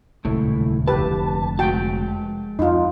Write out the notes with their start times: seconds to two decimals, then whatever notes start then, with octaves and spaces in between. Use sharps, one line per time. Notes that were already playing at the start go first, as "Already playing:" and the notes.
0.25 D#1 C#2 B2 A3 E4
0.88 F1 D3 G4 B4 A5
1.59 G#3 F#4 G5 A5
2.59 F2 D#4 F4